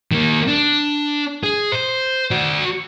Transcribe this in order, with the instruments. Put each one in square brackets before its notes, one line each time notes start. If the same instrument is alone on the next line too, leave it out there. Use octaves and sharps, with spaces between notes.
[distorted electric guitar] D#3 A#3
D4
G#4
C5
F#4 D5